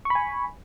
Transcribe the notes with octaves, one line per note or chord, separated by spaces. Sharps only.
G#5 B5 C#6